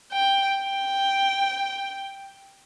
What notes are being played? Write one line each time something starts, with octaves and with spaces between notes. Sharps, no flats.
G5
G5